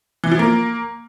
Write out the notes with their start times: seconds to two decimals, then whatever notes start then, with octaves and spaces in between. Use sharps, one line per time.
0.24 E3
0.31 F3
0.39 A#3